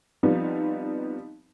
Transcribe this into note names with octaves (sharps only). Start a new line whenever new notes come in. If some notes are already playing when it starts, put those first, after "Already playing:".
F3 G3 B3 C4 D#4